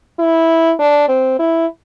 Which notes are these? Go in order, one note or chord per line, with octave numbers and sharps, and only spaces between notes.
E4
D4
C4
E4